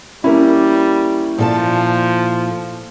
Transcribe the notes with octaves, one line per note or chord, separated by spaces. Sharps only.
G3 A#3 C#4 E4
A#2 F3 A4 A5